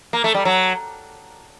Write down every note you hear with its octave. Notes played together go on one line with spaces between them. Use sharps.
A#3
A3
G3
F#3